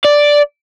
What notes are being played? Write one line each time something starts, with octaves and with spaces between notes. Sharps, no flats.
D5